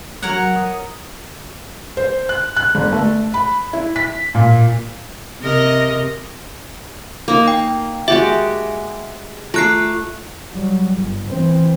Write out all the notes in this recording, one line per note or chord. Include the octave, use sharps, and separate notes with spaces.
F#3 A#4 C#5 F#5
D#6
C5
F#6
F#6
G1
A3
B5
E4
B6
A#2
C3 A#4 D#5
A#3 D#4
G5
G#3 F#4 G4 E5
A3 F4 D6 F#6 C7
F#3 G3
G1
E3 C4